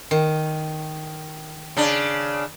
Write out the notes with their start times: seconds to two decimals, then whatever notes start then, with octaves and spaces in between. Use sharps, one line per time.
0.11 D#3
1.77 C#3 D4